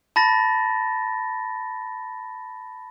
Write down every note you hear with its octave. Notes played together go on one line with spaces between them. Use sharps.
A5 B5 A6 A#6